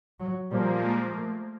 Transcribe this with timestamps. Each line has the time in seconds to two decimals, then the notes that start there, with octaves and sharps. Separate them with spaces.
0.19 F#3
0.51 A#2 F3 G3 A#3
0.81 G#3
1.12 A3